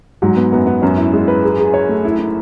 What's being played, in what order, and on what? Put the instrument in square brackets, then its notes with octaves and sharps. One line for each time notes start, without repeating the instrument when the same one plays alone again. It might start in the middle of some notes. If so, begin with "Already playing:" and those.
[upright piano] G#2 [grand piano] F#3
[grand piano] B3
[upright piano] F#2 [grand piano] B3
[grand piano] B3
[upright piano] F#2 [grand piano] C#4
[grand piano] E4
G#3
B4
G#4
G#4
C#5
A3
E4
E4